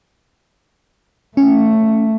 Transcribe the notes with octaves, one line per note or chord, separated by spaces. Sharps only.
A3 C#4